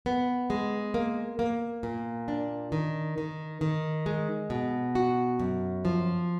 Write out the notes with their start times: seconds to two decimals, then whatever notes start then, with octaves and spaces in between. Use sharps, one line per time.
0.06 B3
0.50 G#3
0.94 A#3
1.39 A#3
1.83 A#2
2.28 D4
2.72 D#3
3.18 D#3
3.61 D#3
4.06 G#3
4.50 B2
4.95 F#4
5.40 F#2
5.85 F3